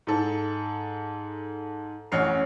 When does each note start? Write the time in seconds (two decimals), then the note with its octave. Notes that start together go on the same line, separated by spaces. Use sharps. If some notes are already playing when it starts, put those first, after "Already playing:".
0.07 G#2 A4
2.12 A1 C#4 F#5 F6 C7